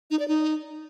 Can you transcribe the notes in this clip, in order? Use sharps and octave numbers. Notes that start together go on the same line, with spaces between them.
D#4
D5
D#4